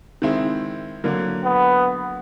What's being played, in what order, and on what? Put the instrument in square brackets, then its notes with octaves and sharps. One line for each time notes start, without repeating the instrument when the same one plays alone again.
[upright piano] D#3 G#3 C4 E4
D3 F#3 A#3
[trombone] B3